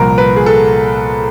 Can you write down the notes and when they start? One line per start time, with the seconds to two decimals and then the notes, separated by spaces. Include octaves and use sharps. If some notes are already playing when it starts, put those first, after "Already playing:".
Already playing: C2 A#2 F3 A#4
0.18 B4
0.36 G#4
0.46 A4